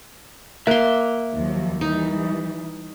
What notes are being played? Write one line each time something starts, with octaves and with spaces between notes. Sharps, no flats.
A#3 E5 C6 F#6
D#2 F3 F#3
E3 G3 D#4